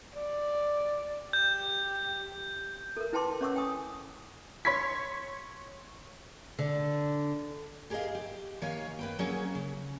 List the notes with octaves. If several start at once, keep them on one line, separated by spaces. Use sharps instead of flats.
D5
G4 G6
A4 A#4
E4 B4 G5 A5 C6 D6
C#4 C#5 F#5 C#6 D6 E6
G5 G#5 D#6
C#5 C6 C#6 G#6 B6
D3
G4 G#4 A#4 B4 D#5 F5
G4
D#3 A#3 C#5 F5 G#5
A#3 B4 G5
F#3 A#3 C#4 G#4 C#5
C#3